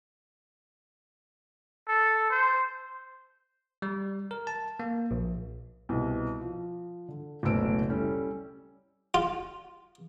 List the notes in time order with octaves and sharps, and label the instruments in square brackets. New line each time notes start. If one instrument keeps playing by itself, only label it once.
[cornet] A4
C5
[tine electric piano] G3
A#4
A5
A#3
A#1
[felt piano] C2 B2
F3
D3
F#1 D2 B2 C5 E6 D7
G3 C#4 E4 A4
[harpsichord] F4